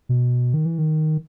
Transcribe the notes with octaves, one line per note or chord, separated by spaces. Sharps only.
B2
D#3
E3
D#3